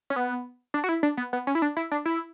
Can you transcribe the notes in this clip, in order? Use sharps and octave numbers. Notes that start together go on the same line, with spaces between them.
C#4
B3
D4
F#4
E4
D4
B3
B3
C#4
E4
D4
E4
D4
E4